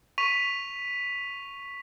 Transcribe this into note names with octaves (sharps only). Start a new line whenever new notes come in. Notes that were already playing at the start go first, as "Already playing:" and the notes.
C#6 B6 D#7 F7